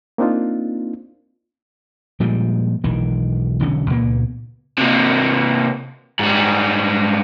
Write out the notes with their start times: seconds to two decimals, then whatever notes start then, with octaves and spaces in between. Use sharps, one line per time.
0.18 A#3 C4 D4 D#4 F4
2.20 A#2 F3 G3 G#3
2.84 E1 B1 D#3 E3
3.60 E1 B1 D3 C#4
3.90 C#2 A#2 A#3 B3
4.78 C3 A#3
6.19 G#2 G3